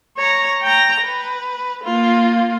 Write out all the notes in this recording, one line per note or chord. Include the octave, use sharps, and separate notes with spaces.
C#5 A#5
G5 A#5
B4
A#3 F4